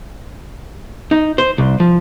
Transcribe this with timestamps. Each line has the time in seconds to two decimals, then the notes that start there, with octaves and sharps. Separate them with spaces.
1.11 D#4
1.38 C5
1.58 C2
1.80 F3